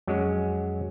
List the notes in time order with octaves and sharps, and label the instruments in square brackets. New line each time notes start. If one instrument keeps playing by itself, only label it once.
[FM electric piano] F2 [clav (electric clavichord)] F#3 G#3 C#4